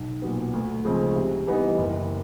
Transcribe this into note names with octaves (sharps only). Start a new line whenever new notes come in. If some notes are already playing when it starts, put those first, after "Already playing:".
Already playing: B1
A#2 F#3 B3
D2
C#3 F3 G#3 C4
C3
E3 G3 B3 D#4
F#1